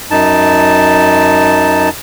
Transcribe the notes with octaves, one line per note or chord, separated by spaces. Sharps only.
F#2 D#4 A5